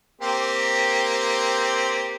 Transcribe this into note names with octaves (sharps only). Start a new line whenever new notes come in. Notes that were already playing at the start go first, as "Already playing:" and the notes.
A#3 C4 G4